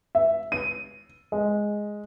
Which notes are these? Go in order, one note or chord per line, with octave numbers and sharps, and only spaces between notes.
E5
D#7
G#3